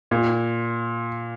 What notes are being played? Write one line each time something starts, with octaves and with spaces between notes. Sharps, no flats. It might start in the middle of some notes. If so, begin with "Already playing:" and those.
A#2